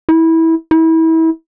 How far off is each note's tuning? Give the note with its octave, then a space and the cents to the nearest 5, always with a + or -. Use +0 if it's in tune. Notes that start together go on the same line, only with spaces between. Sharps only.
E4 -20
E4 -30